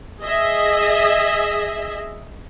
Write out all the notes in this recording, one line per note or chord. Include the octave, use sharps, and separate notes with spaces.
G#4 D#5 E5